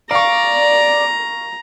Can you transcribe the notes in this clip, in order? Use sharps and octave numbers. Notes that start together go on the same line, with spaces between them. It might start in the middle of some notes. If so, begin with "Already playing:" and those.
D5 F5 A#5 C#6